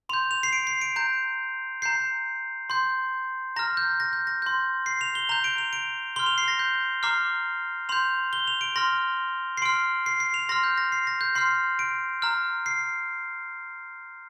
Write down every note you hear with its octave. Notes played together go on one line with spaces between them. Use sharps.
C6 G6 F7
F7
C7
D7
C7
D7
A#5 G6 D7
A#5 G6 C7
C6 G6
A#5 F6 A#6
G6
A#6
G6
A#6
C6 G6
C7
F7
G7
A#5 G6 F7
D7
F7
D7
C6 F6 G7
F7
C7
A#6
G6
A#5 D6 F6 C7
C6 G6 F7
G7
F7
D7
C6 F6 A#6
C7
C6 F6 D7
C7
C7
F7
C6 F6 A#6
G6
A#6
C7
A#6
G6
C6 F6 C7
D7
A#5 F6
C7